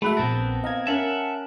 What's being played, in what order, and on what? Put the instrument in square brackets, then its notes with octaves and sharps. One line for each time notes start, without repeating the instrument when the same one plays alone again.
[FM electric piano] G#3 F#4 E5 [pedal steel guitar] A3 [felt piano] B5 F#6
[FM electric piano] A#1 A5 [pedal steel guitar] B3 C4 A#4
[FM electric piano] D#5 A#5 G#6 [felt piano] F5
[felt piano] C#4 A#4 [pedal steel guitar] E5 F#5 [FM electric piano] A5 F#6